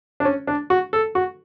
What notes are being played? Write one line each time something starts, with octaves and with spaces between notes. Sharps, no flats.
D4
C#4
D4
F#4
A4
F#4